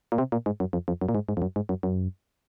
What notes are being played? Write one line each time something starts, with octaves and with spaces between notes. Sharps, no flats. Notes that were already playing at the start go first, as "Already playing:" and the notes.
A#2
C3
A#2
G#2
F#2
F2
F2
F#2
A#2
G#2
G#2
F2
F#2
G#2
F#2
F#2